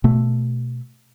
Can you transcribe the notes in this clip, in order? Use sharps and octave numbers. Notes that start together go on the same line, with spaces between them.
B2 A3